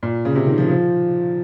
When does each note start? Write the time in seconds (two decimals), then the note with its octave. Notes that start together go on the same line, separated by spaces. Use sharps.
0.03 A#2
0.25 C#3
0.35 C3
0.46 D#3
0.58 F3
0.69 F3